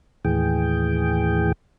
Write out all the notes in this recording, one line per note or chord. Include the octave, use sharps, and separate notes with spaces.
D#2 A2 E3 G#4 G5